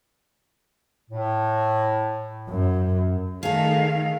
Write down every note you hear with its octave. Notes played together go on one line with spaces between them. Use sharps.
A2
F#2
D#3 A3 G#4 A4 F5